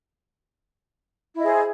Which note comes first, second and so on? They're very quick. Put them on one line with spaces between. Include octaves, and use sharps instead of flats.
E4 D#5 G#4 C5